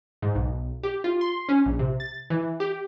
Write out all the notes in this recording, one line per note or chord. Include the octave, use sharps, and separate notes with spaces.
G#2
B1
G4
F4
C6
C#4
A#1
C3
A6
E3
G4